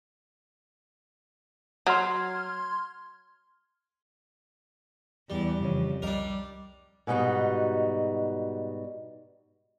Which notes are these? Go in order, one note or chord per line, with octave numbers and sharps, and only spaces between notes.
F#3 C6 F6 G#6
E2 G3
F2 C#3 E3 C#5
C2 G3 D4 A#4 D#5
G#2 B2 G3 D#4 F#4